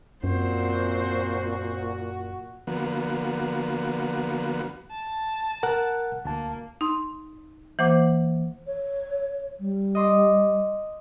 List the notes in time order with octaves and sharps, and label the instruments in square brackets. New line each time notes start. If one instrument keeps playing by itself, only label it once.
[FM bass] F#2 [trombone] A#2 [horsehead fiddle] C4 C5 [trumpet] F#4
[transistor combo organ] D3 F3 A#3 B3 F#4
[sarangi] A5
[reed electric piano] A#4 F#5 F#6
[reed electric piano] D2 A5 [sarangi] A#3
[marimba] D#4 C6
E3 A#3 C5 F#5 D6
[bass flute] C#5
G3
[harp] D#5 C6 D6